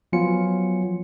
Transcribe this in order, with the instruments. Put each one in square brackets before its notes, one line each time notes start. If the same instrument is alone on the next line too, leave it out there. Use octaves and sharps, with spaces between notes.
[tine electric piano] F3 F#3 B3 F4 G#5 C#7